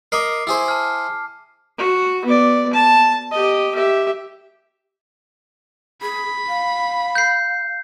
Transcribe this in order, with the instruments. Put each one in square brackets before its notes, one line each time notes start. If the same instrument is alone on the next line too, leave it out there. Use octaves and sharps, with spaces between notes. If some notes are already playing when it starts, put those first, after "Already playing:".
[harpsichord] A#4 D#5 B5 [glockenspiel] D6 C7
[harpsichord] E4 G#4 C5
[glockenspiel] A5 F6
[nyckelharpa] F#4
B3 D5
A5
G4 D#5
G4 E5
[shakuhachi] G#4 [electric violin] B5
[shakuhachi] F5
[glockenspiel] G6 C7